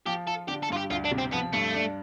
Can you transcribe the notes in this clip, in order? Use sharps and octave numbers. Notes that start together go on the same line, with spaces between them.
F3 G4
F4 A4
D3 G4
A4
G2 F4
G4
D2 F4
D4
C3
C4
F3 B3
G2 A3
D4